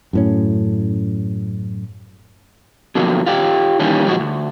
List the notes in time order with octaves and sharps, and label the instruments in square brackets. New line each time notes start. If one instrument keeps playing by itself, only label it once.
[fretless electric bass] F#2 A2 C#4
[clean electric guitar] B2 D3 F3 F#3 A#3
F4 G4 D5
D#3 E3 G3 A#3 C#4
A#2 F3 F#3 G#3 E4 F#4
D2